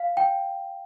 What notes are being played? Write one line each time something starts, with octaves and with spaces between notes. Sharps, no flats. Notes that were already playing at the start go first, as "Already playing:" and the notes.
Already playing: F5
G5